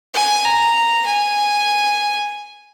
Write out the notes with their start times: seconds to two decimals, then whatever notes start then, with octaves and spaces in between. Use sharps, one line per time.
0.14 G#5
0.45 A#5
1.07 G#5